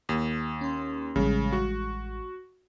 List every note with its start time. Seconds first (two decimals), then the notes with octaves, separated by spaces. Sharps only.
0.09 D#2
0.61 C#4 C6
1.16 A1 C#3 E3 G3 G#3
1.52 F#4